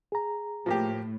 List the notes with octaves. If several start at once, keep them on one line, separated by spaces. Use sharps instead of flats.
G#4 A#5
A2 F3 A#3 G4